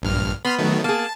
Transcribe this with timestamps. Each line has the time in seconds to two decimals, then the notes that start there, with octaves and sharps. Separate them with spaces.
0.02 A#1 G2 F6
0.45 B3 B5 C6 F6
0.59 D#3 F#3 A3
0.84 A#3 G#4 A5